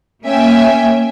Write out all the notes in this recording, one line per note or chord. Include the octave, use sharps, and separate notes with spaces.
A#3 C#4 E5 G5 G#5